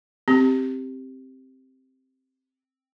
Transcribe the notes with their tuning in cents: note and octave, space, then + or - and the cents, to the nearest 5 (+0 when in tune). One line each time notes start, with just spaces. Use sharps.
C4 +0 G4 +0